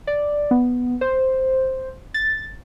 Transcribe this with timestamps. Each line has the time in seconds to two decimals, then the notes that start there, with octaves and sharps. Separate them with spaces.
0.07 D5
0.51 B3
1.01 C5
2.14 A6